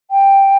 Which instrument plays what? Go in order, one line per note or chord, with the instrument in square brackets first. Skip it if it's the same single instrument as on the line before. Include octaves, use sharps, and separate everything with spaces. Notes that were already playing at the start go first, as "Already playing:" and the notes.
[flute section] G5